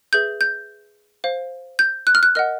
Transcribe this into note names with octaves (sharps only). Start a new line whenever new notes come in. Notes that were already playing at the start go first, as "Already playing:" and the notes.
G#4 B4 E5 G6
G6
C5 F5
G6
F#6
F6
F#6
A#4 D#5 F#5 F6